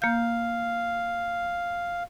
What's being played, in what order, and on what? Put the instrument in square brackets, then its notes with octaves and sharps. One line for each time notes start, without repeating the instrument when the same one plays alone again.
[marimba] A#3 G6 [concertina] F5